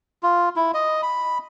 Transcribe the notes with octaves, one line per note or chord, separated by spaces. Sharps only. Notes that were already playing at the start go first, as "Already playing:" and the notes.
F4
E4
D#5
B5